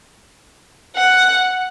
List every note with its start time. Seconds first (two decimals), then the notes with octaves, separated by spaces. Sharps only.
0.96 F#5